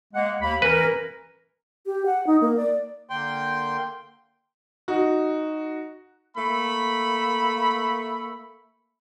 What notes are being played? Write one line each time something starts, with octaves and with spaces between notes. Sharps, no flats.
G#3 A#3 F#5
D#2 A#3 B5
E3 C#4 A#4 B4
G4
F#5
D#4
A#3
D5
D3 A#3 G5 C6
D#4 F#4
A3 A#3 E5 B5